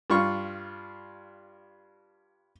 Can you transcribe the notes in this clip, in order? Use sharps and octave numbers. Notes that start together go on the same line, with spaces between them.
G2 F4 C#6